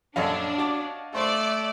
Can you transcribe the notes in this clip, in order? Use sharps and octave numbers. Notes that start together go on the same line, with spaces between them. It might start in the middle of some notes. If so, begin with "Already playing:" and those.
A#1 F#2 D4 A4 C#5 D#5 F5
F#4 D5 A5
A3 C5 D5 C6 C#6